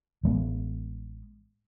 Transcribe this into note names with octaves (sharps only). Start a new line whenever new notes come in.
A1 G#3 B3